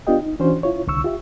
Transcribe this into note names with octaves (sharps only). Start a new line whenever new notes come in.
B3 D4 F4 G4 D#5 G5
D#4
E3 C#4 D4 F#4 C5 C#5
E4 F4 C#5
C2 D3 C#6 E6
F4 G4 E5